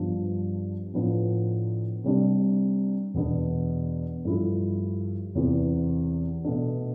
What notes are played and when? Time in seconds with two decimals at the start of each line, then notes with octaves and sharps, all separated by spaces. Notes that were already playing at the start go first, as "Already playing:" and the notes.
Already playing: G2 F3 B3 D4
0.93 A2 F3 B3 D4
2.04 C3 G3 D4
3.14 E2 B2 B3 D4
4.25 G2 F3 A3 E4
5.35 E2 C3 E3 B3
6.45 B2 A3 D4